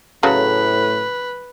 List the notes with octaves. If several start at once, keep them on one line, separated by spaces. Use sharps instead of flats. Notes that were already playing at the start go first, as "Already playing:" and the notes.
A2 C#3 F#3 A3 B4